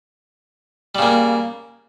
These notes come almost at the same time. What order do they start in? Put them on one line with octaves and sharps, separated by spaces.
G3 C#3 A#3